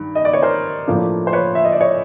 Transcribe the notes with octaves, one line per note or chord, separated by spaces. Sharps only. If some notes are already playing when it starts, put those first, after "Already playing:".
Already playing: G2 D#3
D#5
D5
C#5
A#4 C5
A2 F3 A#3 D4
C5
B4 C#5
E5
D#5
D5
C#5 D#5